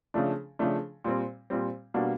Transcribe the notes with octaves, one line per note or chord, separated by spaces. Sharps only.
C#3 F3 A3 D4
C#3 F3 A3 D4
A#2 G3 C4
A#2 G3 C4
B2 G3 A#3 D4 F#4